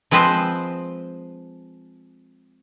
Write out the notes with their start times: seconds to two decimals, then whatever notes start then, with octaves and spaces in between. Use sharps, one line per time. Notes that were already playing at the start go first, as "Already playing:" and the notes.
0.11 F3 G#3 C4 B4 C5